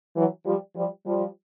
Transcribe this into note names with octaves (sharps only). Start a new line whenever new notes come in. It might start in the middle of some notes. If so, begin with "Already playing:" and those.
E3 F#3
F3 G3
F3 G3
F3 G3